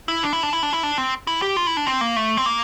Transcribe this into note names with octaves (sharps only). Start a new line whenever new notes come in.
E4
D4
E4
D4
E4
D4
E4
D4
C4
E4
G4
F4
E4
D4
C4
A#3
A3
C4
A#3